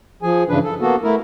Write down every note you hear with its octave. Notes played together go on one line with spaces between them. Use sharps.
F3 G#4 G#5
G2 C#3 E3 D4 B4
A4
A#3 B3 F#4 A4
A3 E4 A#4